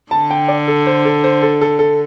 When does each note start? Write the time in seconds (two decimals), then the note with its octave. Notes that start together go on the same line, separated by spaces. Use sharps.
0.11 D3 A5
0.31 G5
0.48 D5
0.68 A4
0.87 C5
1.05 A4
1.24 C5
1.42 A4
1.61 A4
1.79 A4